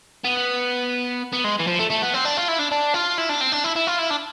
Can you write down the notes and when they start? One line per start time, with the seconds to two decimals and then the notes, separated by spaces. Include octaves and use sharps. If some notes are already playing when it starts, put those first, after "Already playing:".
0.25 B3
1.33 B3
1.44 G#3
1.59 E3
1.67 F3
1.79 A3
1.90 A3
2.02 B3
2.14 C4
2.25 D4
2.37 F4
2.48 E4
2.59 D4
2.72 D4
2.94 F4
3.18 E4
3.29 D4
3.41 C4
3.52 D4
3.64 E4
3.76 E4
3.87 F4
3.99 E4
4.11 D4